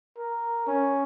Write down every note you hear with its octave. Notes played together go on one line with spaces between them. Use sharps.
A#4
C#4